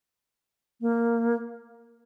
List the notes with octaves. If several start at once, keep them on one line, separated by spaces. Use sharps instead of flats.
A#3